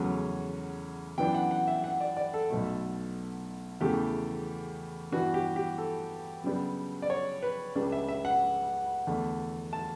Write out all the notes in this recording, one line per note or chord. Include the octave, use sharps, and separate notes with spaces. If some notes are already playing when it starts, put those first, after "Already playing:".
Already playing: E2 C#3 F#3 A3 C#4
F#2 E3 B3 D4 G5
F#5
F#5
E5
F#5
D5
D5
A4
B1 B2 A3
E2 C#3 E3 A3 G4
G2 E3 B3 D4 F#4
G4
G4
A4
F#2 C#3 G3 B3 D4
D5
C#5
B4
C#2 C#3 G3 D4
E5
E5
F#5
E2 D3 A3 D4
A5